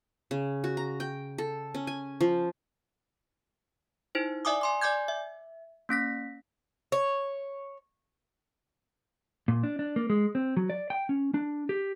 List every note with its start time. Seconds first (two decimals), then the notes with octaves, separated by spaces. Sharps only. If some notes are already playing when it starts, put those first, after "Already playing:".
0.31 C#3
0.64 F#4
0.77 A#5
1.00 G5
1.38 A4
1.75 C#4
1.87 G#5
2.21 F3
4.15 D#4 E4 C5
4.45 D5 E5 G#5 D6 D#6
4.61 G#5 C6 D6
4.81 D5 G#5 D6 G6 G#6
5.08 E5
5.89 A#3 C#4 A#6 B6
6.92 C#5
9.48 A#2
9.63 D4
9.79 D4
9.96 A#3
10.10 G#3
10.35 C4
10.57 F#3
10.70 D5
10.90 G5
11.09 C#4
11.34 D4
11.69 G4